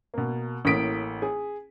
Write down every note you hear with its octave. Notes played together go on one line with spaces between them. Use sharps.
B2 A#3
A1 A2 A#3 D#6 B6 D7
G#4